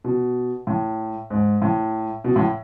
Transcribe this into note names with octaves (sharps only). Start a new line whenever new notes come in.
B2
A2
G#2
A2
B2
A2